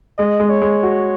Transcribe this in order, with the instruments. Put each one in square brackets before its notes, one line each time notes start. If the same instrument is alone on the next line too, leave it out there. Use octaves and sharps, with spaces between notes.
[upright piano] G#3 [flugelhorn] D#5
[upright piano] G#3
[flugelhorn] C#5
[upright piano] G#3
F#4